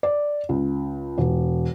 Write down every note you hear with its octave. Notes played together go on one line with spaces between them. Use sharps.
D5
C#2
E1